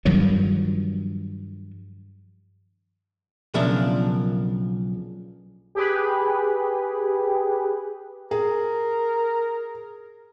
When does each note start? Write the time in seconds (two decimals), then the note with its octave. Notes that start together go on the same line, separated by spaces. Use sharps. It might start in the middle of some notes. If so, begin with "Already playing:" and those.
0.05 G2 D#3 F3 F#3
3.54 B1 C#3 F3 A#3 D4 E5
5.75 G4 G#4 B4
8.31 G#4 A#4